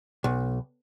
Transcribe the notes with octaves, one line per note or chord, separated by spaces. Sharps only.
B1